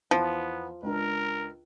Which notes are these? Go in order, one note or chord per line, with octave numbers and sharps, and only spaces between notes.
E2 F3 B3
C#2 D4 A#4